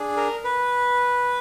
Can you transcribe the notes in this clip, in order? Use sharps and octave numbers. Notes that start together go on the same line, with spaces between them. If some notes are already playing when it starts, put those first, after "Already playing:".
Already playing: D4 G#4
A#4
B4